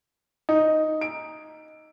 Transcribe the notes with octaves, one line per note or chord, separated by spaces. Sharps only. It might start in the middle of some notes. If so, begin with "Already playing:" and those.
D#4
D7